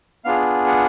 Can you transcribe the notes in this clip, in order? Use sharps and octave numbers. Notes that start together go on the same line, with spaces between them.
B3 D4 F4 G#4 F5
F#5